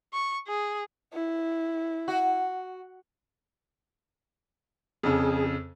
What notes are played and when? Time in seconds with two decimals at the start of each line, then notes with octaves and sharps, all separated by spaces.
0.13 C#6
0.48 G#4
1.13 E4
2.08 F#4
5.03 F2 C#3 G#4